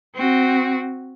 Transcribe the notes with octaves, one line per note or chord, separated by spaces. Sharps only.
C4 F#4